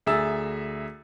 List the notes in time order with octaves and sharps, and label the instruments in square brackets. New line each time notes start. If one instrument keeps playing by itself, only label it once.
[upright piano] D2 G#4 E5 A#5 E6 A6